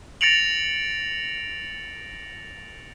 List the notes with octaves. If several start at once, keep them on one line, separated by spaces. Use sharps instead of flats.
A6 A#6 C#7 D7 F7 F#7